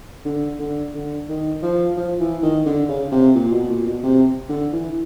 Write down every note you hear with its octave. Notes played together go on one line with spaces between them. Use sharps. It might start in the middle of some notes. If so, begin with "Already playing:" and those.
D3
D3
D3
D#3
F3
F3
E3
D#3
D3
C#3
C3
A#2
B2
A#2
B2
C3
D3
E3